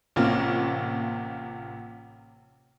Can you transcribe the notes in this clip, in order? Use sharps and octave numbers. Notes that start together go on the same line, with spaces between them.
A1 C3 A#3 F4